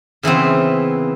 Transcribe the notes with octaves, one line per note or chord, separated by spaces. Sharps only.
C#3 E3 B3 C4